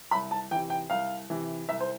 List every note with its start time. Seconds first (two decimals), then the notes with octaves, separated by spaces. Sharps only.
0.11 C2 B5
0.31 A5
0.51 E3 G5
0.55 C3
0.70 G5
0.90 C2 F5
1.30 C3 E3
1.69 C2 E5
1.80 C5